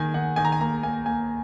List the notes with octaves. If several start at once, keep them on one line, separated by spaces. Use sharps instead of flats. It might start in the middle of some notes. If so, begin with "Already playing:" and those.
Already playing: D#3 A#3 G#5
D#3 F#5
D#3 G#5
A#5
G#5
A#3 A#5
A#3 G#5
A#3 G#5